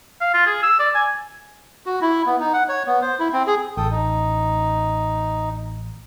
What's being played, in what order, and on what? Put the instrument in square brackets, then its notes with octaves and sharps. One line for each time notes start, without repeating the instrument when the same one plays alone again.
[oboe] F5
F4
G#4
E6
D5
G#5
[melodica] F#4
E4
B3
D#4
F#5
C#5
B3
C5
E4
C4
G#4
[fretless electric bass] A1 [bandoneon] A4 G5 D#6
[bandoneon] D#4